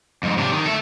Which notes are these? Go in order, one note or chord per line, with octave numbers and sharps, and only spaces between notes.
F2 G#2
C3 D4
D#3
A4 E5